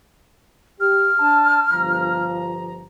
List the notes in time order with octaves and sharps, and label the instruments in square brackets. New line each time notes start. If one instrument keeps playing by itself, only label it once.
[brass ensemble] G4 [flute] F6
[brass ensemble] D4 A5
G1 F3 A#5